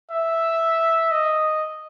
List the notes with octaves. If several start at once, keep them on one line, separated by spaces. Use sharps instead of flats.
E5
D#5